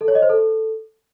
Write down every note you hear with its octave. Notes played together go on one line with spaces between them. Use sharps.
A4
C#5
D#5
C5
A4